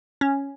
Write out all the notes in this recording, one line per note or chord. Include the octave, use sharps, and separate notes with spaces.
C#4